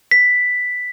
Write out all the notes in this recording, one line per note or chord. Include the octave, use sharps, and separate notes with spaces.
B6